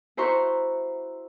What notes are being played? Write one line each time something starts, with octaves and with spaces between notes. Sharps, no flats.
E4 F#4 C5 A#5 C6 C#6